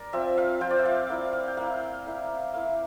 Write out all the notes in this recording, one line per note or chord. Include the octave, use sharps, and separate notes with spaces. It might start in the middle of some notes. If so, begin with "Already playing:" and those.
Already playing: A#4 D5
F3 C4 F4 E5
F5
F3 C4 F4 G5
D5
E5
F5
A#3 E4 F5
F5
G5
A#3 E4 F5
A#3 E4
A#3 E4 F5